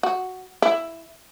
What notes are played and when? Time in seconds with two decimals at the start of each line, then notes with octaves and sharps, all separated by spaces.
0.03 F#4
0.62 E4